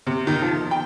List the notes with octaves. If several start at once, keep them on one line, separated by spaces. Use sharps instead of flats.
C3
D#3
F3
G5